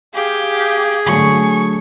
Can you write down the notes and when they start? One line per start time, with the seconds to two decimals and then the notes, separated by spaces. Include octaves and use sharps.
0.14 G4 G#4 F5
1.06 D3 F#3 A3 G#5 C#6